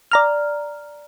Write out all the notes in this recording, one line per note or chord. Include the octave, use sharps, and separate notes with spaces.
D5 A#5 F6